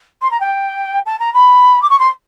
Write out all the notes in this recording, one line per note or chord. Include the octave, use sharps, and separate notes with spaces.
C6
A#5
G5
A5
A#5
B5
D6
C#6
C6